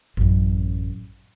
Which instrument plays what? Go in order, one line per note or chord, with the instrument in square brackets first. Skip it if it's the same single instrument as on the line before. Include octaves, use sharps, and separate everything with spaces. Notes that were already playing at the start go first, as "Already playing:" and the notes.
[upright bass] A1 F#2